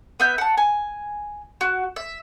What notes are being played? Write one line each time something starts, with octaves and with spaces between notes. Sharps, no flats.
B3 E5 G6
F#5 A5
G#5
F#4
E5